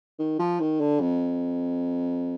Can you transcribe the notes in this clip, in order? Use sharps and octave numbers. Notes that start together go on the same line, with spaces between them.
D#3
F3
D#3
D3
F2